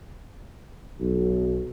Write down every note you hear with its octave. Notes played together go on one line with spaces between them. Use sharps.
B1